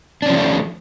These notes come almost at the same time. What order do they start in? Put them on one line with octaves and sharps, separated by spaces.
D4 C#4 F3 D#3 A3